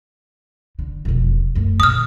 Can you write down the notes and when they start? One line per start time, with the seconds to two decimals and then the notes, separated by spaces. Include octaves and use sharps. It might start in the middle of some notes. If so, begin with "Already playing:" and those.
0.79 D3
1.05 E1 F2
1.55 F#2 A3
1.80 A#2 D3 D#6 F6